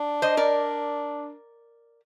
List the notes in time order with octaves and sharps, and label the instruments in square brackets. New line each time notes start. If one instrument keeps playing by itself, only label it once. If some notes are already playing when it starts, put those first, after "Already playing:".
Already playing: [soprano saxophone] D4
[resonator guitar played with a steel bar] C5 D#5
A#4 D5